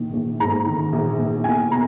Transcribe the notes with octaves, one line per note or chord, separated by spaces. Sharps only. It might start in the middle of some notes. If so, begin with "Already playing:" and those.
Already playing: A#1 D#3
A#1
G#2 A#5
D#3
A#1
A#1
E2 G#5
B2 A#5